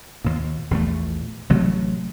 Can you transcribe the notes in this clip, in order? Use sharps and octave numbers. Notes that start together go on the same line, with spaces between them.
D#2 A#2
A#1 E2 A#2 A3
A1 C3 F#3 A3